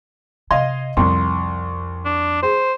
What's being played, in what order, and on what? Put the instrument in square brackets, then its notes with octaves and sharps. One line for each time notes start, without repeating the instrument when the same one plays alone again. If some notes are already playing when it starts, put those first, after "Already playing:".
[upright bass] C3 [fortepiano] D#5 F5 C6 [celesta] G#6
[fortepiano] C2 [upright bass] F2 [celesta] C6
[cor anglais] D4
[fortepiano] G#4 [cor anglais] C5